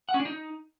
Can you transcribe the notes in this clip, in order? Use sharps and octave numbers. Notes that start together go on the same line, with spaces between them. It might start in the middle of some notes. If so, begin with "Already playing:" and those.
F#5
C#4
D4
D#4